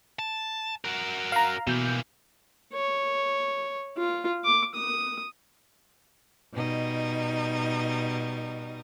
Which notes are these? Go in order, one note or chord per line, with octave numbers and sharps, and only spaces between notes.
A5
F#4 A#4
F5 A#5
B2 E3 A#3 G6
C#5
F4
D6
D#6
B2 G3 D#4